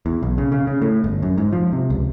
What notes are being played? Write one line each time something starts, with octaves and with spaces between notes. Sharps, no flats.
E2
B1
C#3
C#3
C#3
A2
G1
F#2
G#2
F3
C3
C#2